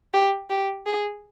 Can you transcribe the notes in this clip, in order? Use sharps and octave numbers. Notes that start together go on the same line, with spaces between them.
G4
G4
G#4